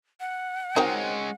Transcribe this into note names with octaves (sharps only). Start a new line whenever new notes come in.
F#5
G#3 C4 C#4 D#4 F#4 A#4 G5